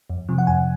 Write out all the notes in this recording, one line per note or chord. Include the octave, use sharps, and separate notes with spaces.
F2
C3 F3
F#5
F2 G#5